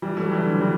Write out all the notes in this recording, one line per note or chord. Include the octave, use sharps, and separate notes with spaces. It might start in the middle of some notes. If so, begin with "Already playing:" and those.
E3 G3
F#3 A3
E3 G3
D3 F#3
E3 G3